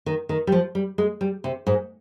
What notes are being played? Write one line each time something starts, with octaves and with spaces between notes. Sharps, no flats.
D#3
D#3
G3
F3
G3
G#3
G3
C3
G#2